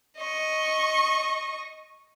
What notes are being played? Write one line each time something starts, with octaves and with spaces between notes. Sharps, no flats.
D#5 C#6